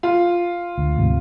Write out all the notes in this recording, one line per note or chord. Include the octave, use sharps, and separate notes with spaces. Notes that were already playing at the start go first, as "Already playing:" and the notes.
F4
D2
D2 G#2 C3